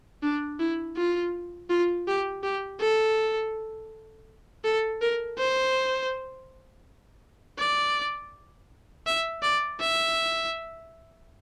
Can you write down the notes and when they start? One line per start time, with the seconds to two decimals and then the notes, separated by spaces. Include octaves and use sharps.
0.23 D4
0.60 E4
0.97 F4
1.70 F4
2.08 G4
2.44 G4
2.81 A4
4.64 A4
5.01 A#4
5.39 C5
7.59 D5
9.07 E5
9.43 D5
9.81 E5